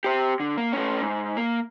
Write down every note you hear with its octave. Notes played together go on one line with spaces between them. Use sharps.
G4 C5
D3
A#3
A3 C#4
G#2
A#3